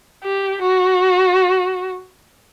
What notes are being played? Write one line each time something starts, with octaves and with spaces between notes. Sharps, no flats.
G4
F#4